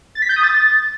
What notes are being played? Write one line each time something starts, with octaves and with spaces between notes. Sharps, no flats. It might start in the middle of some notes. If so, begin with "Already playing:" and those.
A6
B6
G6
D#6
A6